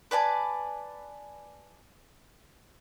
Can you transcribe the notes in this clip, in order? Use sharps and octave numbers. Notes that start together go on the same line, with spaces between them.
B4 D5 G#5 A5